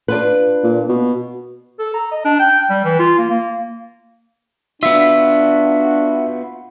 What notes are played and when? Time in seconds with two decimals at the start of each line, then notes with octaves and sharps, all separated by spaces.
0.08 D4 F4 B4
0.63 A#2
0.89 B2
1.79 A4
1.94 A#5
2.12 D#5
2.25 D4
2.40 G5
2.70 G3
2.85 E3
2.99 F4
3.19 A#3
3.31 A#3
4.83 B3 D4 F4 F#4 E5